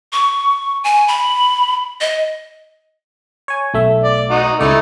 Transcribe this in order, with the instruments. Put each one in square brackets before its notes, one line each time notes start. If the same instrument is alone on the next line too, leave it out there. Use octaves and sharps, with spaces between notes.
[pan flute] C#6
G#5
B5
D#5
[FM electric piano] C#5 G#5
B1 A3 E5
[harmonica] D5
D#4 F#4
[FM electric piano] C#2 D5 [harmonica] A3 D#4 E4